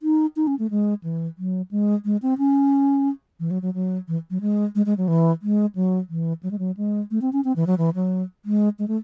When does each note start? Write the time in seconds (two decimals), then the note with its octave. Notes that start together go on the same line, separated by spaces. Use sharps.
0.03 D#4
0.36 D#4
0.47 C#4
0.59 A3
0.71 G#3
1.04 E3
1.38 F#3
1.71 G#3
2.05 G#3
2.22 C4
2.38 C#4
3.40 E3
3.51 F#3
3.62 F#3
3.74 F#3
4.08 E3
4.30 F#3
4.41 G#3
4.75 G#3
4.86 G#3
4.98 F#3
5.08 E3
5.42 G#3
5.75 F#3
6.09 E3
6.43 F#3
6.51 G#3
6.59 F#3
6.77 G#3
7.11 A3
7.22 C4
7.33 C#4
7.45 C4
7.56 E3
7.67 F#3
7.78 E3
7.95 F#3
8.45 G#3
8.79 G#3
8.88 A3